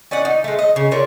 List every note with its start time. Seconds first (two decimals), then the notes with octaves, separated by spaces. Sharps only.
0.11 C#4 D5 D#5 F#5
0.25 D#4
0.44 G#3 A3
0.59 D#5
0.76 C#3
0.91 D4 F4 A#4 C#5